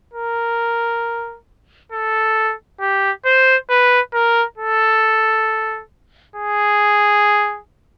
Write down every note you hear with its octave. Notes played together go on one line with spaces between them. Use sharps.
A#4
A4
G4
C5
B4
A#4
A4
G#4